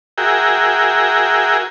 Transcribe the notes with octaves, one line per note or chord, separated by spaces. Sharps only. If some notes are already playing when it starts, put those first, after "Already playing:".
F#4 G#4 A#4 E5 G5